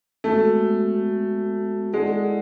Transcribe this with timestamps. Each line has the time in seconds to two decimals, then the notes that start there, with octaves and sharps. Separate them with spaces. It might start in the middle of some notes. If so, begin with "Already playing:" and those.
0.24 G#3 A3 B3 F#4
1.93 G#3 E4 A4 D5 F#5